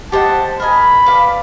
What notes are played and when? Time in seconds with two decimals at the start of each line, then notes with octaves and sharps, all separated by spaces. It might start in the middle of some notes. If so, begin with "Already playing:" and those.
0.12 G4 C5 D#5 F#5 A5
0.59 A#4 D#5 G#5 B5
1.06 B4 D5 F5 A5